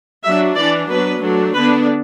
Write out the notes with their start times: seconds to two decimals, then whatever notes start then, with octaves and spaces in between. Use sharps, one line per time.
0.24 F#3 D4 E5
0.56 E3 D4 D5
0.89 F#3 B3 D4 B4
1.22 F#3 A3 D4
1.54 D3 B3 D4 B4